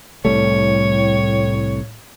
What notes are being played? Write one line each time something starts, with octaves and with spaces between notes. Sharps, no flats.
C2 A2 G3 A3 C#5